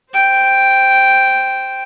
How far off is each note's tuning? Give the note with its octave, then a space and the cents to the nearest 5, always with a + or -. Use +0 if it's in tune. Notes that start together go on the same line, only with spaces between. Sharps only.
C5 +0 G5 +0